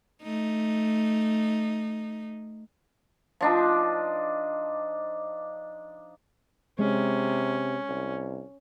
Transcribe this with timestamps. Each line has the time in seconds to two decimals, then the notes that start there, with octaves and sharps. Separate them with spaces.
0.23 A3 D#4
3.41 F3 D4 D#4
6.79 C3 G#3 C#4
7.89 C2